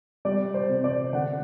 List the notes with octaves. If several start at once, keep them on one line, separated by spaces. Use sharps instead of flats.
G3 D5
C5
C3
D5
D3 F#5